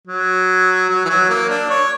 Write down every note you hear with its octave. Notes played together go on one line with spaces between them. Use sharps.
F#3
F#3
E3
F#3
A#3
D4
C#5